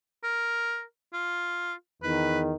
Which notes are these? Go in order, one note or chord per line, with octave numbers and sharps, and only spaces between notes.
A#4
F4
E2 D#3 B4